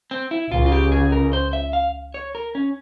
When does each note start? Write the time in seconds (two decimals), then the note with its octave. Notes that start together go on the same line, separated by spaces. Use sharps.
0.11 C4
0.31 E4
0.51 C#2 C#3 F4
0.66 F4
0.72 G4
0.92 G#4
1.12 A#4
1.33 C5
1.53 E5
1.73 F5
2.14 C#5
2.35 A#4
2.55 C#4